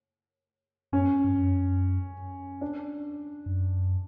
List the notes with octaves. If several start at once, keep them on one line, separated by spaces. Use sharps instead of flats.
F#2 C#4
G2
F#2
D4
F#2